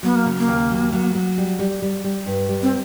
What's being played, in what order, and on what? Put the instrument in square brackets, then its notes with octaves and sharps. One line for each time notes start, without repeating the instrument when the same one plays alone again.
[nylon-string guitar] F#3 [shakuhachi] B3
[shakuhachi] A#3
[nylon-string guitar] C#3
[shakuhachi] A#3
[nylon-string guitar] D#2
F#3
F#3
F#3
G3
G3
G3
G3
G2
G3
[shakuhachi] C4